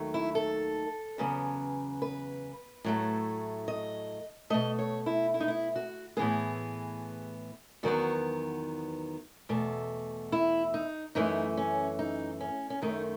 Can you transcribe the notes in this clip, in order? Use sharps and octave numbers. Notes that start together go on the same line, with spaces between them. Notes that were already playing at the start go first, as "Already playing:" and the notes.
Already playing: D#2 D#3 F#3 A3
E4
A4
E2 C#3 F#3 B3
B4
A2 F#3 A3
D#5
B2 A3 D#5
C#5
E4
E4
D#4
E4
F#4
A2 E3 B3 G#4
E2 D#3 F#3 B3 F#4
E2 B2 A3
E4
D#4
F#2 E3 A3 D#4
C#4
D#4
C#4
C#4
F#2 D#3 A3 D#4